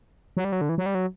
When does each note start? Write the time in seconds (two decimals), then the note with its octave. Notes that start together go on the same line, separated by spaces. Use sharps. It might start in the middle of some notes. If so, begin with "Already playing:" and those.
0.37 F#3
0.45 G3
0.52 F#3
0.61 D3
0.69 E3
0.78 F#3
0.86 G3
0.95 F#3